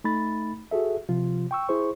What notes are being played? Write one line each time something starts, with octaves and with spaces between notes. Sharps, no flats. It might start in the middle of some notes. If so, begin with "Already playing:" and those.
A3 D#4 B5 A6
F#4 G#4 A4 E5
C3 F3 F4
G5 C#6 E6
E4 G#4 C5 C#6